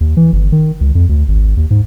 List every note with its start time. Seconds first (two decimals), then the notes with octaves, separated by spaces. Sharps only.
0.01 D#2
0.17 E3
0.33 G1
0.52 D#3
0.81 C#2
0.95 F2
1.09 D2
1.28 G#1
1.57 D#2
1.71 G#2